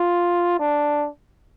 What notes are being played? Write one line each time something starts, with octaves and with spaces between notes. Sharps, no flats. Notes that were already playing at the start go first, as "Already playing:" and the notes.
Already playing: F4
D4